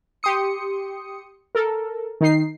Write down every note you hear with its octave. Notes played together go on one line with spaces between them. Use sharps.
G4 C6 D#6 C#7
A4 A#4
D#3 D#4 C7